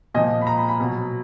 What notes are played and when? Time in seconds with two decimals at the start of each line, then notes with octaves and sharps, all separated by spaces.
0.14 A#2 F3 D#5
0.41 B5
0.47 A#5
0.58 B5
0.69 B5
0.79 B2 F#3